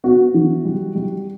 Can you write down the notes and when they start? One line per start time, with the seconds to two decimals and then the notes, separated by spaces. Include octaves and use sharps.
0.04 B3 F#4
0.34 E3
0.65 G3
0.95 G3